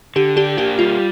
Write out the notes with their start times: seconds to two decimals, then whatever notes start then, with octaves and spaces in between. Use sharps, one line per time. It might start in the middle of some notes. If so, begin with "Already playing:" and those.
0.16 D3 G4
0.36 D4 G4
0.57 A#3 G4
0.79 G3 F4